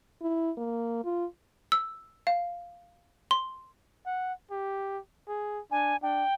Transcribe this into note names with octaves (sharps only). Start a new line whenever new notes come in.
E4
A#3
F4
E6
F5
C6
F#5
G4
G#4
D4 G#5
D4 G5